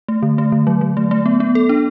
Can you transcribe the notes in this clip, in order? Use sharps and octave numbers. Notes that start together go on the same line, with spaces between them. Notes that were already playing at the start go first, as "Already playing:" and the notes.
A3
D3
A3
D3
F#3
F#3
A3
A3
B3
B3
A4
D4